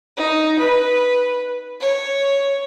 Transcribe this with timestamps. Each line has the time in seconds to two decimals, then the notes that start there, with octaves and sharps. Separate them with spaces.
0.17 D#4
0.59 B4
1.81 C#5